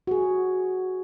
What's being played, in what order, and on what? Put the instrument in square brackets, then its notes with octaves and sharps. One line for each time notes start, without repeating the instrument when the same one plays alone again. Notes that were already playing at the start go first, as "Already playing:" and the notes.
[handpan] F#4 G#4